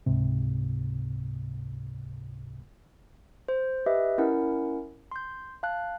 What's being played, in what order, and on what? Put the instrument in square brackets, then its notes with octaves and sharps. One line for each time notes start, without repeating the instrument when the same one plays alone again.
[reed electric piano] C#2 G#2 C3
[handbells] C5
G4 B4 D#5 E5
C#4 E4 A#4 F#5
C6 G6
F5 A5 F#6